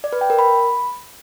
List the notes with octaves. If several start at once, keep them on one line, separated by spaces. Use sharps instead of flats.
D5
B4
G5
A#4
B5